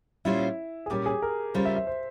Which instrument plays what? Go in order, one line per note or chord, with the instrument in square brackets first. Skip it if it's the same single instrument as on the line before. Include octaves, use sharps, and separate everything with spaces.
[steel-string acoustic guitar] A#2 G3 C#4 F4 C5 [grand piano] E4
[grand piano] G#4
[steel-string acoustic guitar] A#2 G3 C#4 [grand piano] G4
[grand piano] G#4
A#4
[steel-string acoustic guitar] C#3 G3 C#4 F4 A#4 [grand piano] C5
[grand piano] E5
E5
C5